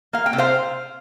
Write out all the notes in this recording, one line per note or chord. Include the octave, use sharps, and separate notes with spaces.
A#3 F5
G5
C3
C5 F5